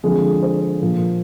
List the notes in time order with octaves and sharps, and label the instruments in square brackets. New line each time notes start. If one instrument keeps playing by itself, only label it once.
[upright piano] D3 F3 G#3 C4 G#4
C5
A#2 F3 A#3